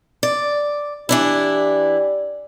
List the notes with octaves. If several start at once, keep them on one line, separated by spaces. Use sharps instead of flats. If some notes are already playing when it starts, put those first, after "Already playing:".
D5
E3 D4 E4 G4 D5